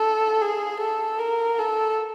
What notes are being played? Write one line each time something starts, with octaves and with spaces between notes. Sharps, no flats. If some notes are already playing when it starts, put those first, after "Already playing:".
Already playing: A4
G#4
A4
A#4
A4